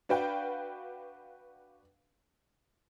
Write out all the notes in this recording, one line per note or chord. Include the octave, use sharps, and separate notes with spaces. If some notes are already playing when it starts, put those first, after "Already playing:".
D4 F#4 B4 F5 G5